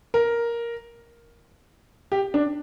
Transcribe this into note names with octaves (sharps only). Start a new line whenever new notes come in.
A#4
G4
D4